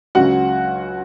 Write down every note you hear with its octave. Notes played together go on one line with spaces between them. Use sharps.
C#2 C#3 F#3 C#4 F#4 F#5